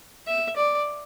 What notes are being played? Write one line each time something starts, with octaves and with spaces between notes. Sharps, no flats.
E5
D5